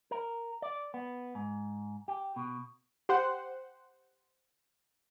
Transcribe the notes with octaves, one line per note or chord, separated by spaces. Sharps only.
A#4
D5
B3
G#2
G4
B2
G4 C5 F#5